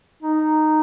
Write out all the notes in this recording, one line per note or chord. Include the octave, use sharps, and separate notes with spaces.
D#4